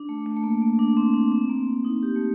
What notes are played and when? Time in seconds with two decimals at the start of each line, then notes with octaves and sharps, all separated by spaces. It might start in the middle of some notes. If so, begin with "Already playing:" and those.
Already playing: D4
0.09 A3
0.26 A3
0.36 A3
0.43 A#3
0.62 A#3
0.79 D4
0.97 C4
1.14 D4
1.32 C4
1.50 A#3
1.85 D#4
2.03 G4
2.16 A3